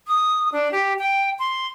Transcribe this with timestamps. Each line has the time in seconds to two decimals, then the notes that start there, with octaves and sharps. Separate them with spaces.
0.08 D#6
0.52 D4
0.72 G4
0.99 G5
1.39 C6